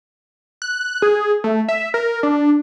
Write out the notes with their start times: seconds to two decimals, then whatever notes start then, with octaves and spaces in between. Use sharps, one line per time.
0.62 F#6
1.02 G#4
1.44 A3
1.69 E5
1.94 A#4
2.23 D4